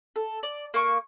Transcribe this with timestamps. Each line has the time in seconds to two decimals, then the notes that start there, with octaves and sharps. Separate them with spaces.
0.16 A4
0.43 D5
0.74 A#3 C#6